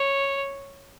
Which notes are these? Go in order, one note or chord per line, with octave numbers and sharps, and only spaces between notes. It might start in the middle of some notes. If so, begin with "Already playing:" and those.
Already playing: C#5